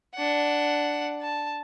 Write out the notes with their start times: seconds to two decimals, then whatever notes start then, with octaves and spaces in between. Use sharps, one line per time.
0.15 D4 F#5
1.22 A5